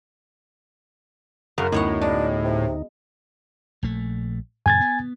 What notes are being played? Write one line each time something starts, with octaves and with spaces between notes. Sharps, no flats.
F#2 C#3 F#5 F6
D2 A2 B3 D#4 C#5 F#5
G#3 D4
C3
A#1 A3
F#2 A#2 C#3 G#5 G#6 A6
B3